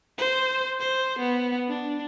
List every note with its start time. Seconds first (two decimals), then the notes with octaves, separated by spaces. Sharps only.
0.18 C5
0.80 C5
1.19 B3
1.69 D4